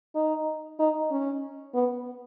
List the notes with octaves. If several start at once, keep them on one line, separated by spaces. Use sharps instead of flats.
D#4
D#4
C#4
B3